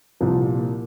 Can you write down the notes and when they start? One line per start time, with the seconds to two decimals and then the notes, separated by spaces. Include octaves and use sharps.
0.21 C2 A#2 F3 C4
0.48 A#3